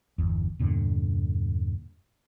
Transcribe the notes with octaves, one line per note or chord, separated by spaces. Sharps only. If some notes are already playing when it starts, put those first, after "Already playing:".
G1 E2
E2 G2 A#2 D3